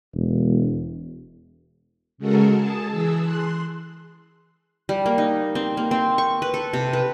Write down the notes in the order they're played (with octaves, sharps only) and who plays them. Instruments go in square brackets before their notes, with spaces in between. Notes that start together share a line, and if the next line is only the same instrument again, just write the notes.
[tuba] E1
[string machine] C#3 G#3 F#4 A4 A#4
G#4 A5
E3 G#4 E6
C6 F#6
[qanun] G3
A#3
D#4
C4
A#3
C4
C#6
B4
A4
C3
B4